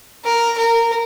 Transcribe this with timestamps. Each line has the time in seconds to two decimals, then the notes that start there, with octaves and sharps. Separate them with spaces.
0.25 A#4
0.57 A#4